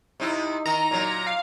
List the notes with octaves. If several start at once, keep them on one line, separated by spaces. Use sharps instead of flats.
C3 D#4 E4
D#3 A#5
A#2 F#3
F5